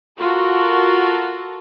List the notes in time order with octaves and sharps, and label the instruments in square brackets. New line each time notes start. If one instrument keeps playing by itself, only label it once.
[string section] F4 F#4 A4 A#4